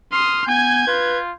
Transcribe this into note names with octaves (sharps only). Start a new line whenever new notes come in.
C6 D#6 F6
B3 G#5 G6 G#6
F4 B4